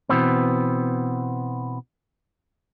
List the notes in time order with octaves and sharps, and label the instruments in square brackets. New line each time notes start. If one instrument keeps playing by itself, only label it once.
[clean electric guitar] B2 E3 B3 C4